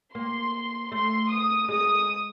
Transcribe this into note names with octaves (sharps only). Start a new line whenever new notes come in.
A#3 C6
A3 C6
D#6
G#3 D#6